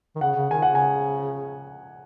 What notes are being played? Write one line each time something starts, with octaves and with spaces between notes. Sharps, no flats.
D#3
C#3 F#5
C#3
D#3 G#5
C#3 F#5
G#5